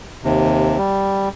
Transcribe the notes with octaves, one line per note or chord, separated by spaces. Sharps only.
D#2 C3
G3